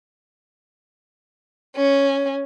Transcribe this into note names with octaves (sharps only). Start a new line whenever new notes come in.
C#4